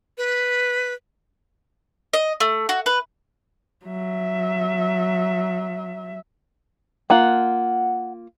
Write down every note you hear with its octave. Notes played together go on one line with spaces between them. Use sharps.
B4
D#5
A3
F#4
B4
F#3 E5
A#3 F4 F#5